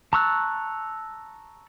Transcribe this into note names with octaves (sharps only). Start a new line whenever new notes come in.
A5 A#5 C#6 E6 F#6